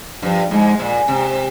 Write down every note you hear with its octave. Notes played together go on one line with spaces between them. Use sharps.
G2 F3
G#2 G#3
A#2
C3